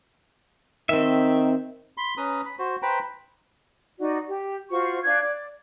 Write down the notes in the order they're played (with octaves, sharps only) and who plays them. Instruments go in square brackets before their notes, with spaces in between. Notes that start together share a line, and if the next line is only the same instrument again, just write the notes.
[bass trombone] D#3 [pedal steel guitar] C4 E5
[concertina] B5 C6
C#4 B4 A#5 D#6
B5
F#4 C5
B4 C5 G5 A#5 B5
[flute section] D#4 F#4 D5
G4
F4 F#4 C5 C#6
D4 F5 F#6 G#6
D5